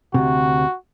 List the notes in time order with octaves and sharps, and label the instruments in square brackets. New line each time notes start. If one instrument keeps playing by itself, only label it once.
[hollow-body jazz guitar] D2 C3 [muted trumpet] F#4